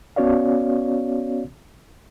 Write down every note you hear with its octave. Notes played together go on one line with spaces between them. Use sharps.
B3 C#4 F#4 C#5 D5 F5